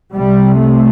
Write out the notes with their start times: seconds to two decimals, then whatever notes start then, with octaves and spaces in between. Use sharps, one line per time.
0.13 C2 C3 G3
0.57 A3